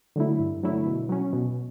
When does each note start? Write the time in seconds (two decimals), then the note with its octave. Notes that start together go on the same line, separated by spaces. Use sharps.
0.16 D3 F#3 A3 E4
0.39 G2
0.63 D3 F#3 A3 E4
0.86 B2
1.09 F#3 C#4
1.33 B2